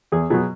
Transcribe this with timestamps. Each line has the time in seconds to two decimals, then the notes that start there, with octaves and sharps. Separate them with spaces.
0.12 E2 G#4
0.30 B2 F#3 G#4